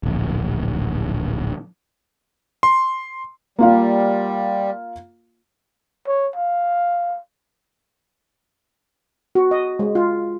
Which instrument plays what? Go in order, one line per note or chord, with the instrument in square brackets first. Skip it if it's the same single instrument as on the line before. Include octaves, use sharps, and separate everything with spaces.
[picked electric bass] D1 A#1
[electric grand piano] C6
[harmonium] G3 [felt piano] A#3 F4 F5
[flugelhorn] C#5
F5
[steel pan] F#4
D#5
G#3
F4